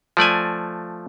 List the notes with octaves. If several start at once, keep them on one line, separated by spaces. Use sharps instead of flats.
F3 A3 D5 G#5